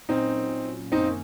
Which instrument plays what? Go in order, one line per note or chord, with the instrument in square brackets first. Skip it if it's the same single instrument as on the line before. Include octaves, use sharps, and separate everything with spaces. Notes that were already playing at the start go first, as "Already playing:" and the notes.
[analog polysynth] A#2 F#3 C#4 [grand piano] C4 D#4
[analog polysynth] F#2 D#3 A#3 C#4 [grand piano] C4 D#4